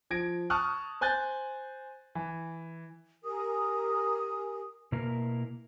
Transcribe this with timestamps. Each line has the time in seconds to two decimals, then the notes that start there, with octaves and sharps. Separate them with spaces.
0.10 F3 G#6 A#6 D7
0.50 A5 C#6 D#6 F6 F#6
1.01 C5 G#5 F#6 G6 A6
2.15 E3
3.24 G4 A#4 G#5 D#6
4.92 B2 A#3 E4 A#4